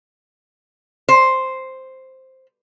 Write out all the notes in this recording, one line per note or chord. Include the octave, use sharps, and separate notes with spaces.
C5